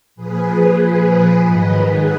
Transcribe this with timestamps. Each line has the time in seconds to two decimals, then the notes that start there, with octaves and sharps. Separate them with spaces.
0.16 A#2 F3 G#4 B4
0.80 A#2 F3 G#4 B4
1.45 G#2 D#3 F#3 B4 D#5
1.77 G#4 B4